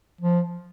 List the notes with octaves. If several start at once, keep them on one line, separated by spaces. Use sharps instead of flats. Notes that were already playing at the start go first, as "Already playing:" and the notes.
F3